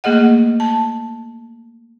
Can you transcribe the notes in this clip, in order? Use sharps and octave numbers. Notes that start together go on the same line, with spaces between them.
A3 A#3 G#4 D#5 F#5
A5